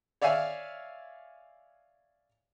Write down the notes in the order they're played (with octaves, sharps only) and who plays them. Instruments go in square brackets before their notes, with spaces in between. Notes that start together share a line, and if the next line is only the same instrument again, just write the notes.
[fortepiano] C#5 D5 E5 F5 G#5